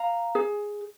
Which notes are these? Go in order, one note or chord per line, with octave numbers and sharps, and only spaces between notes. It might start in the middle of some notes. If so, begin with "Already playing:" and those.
Already playing: F5 A#5
G#4